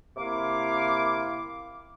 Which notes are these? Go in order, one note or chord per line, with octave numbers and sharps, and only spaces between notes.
C3 A#3 E4 F5 D6